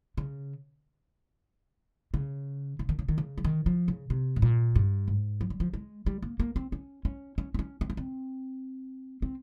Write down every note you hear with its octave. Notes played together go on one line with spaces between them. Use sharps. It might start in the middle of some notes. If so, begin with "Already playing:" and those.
C#3
C#3
C#3
D#3
C#3
D#3
C#3
F3
D#3
F3
C#3
C3
G#2
A#2
G2
G#2
F3
G3
F3
G#3
G3
A#3
A#3
C4
C#4
C#4
C#4
C4
C#4
C4
C#4
C4
C4